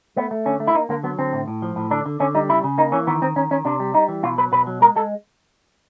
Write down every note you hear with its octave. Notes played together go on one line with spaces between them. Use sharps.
A3 B3
A3
D3 C#4
A3
E4
A#3 D#4
D3 A#3
F#3 B3
D3 C4
A2
A2
F3
A2
D3 D4
D3
D3 C#4
G3 D#4
C#3 E4
C#3
A#3 D#4
E3 C#4
D#3 B3
D#3 C4
D#3 C#4
D#3 C#4
C3 D4
G3
G3 D#4
E3
B2 F4
F#3 B4
B2 B4
F#3
G#3 A#4
G#3 A4